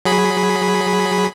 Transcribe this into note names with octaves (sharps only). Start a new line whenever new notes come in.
F#3 G#4 B5